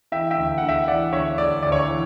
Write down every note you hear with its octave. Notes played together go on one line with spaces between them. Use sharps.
E3 E5 G5
E5 G5
D2
D2 F#5
E5 G5
E3 D5 F#5
D2 C#5 E5
D2 D5
D2 D5
C#5
E3